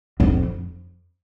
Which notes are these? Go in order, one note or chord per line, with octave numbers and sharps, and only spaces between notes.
F2